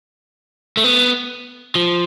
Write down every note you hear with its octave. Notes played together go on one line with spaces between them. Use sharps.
A3
B3
F3